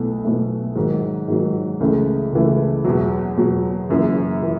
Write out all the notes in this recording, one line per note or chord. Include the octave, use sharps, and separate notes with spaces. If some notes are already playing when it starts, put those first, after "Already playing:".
Already playing: B1 B2 A3 E4
B1 B2 A3 E4
G#2 D#3 F#3
G#2 D#3 F#3
C#2 C#3 E3 A3
C#2 C#3 E3 A3
E2 B2 F#3
E2 B2 F#3
F#1 F#2 E3
E3